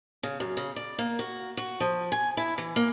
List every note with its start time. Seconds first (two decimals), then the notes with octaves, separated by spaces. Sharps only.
0.23 C#3
0.40 F#2
0.57 C#3
0.76 D5
0.99 A#3
1.19 F#4
1.57 F#4
1.80 F3
2.12 G#5
2.37 E4
2.58 E3
2.76 A#3